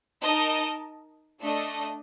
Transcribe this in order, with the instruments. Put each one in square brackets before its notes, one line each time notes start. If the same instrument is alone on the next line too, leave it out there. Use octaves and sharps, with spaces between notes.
[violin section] D#4 A#4 D#5 A5
A3 D4 A4 D#5